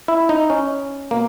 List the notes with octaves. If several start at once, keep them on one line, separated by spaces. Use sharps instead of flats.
E4
D#4
C#4
B2 A#3